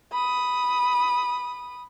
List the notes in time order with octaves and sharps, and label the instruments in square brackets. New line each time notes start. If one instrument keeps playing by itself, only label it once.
[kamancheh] B5 D#6